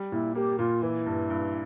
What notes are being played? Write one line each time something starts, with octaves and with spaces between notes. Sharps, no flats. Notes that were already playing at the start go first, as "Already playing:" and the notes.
Already playing: G3
A#2 E4
A#3 G4
A#2 F4
E3 E4
G2
G2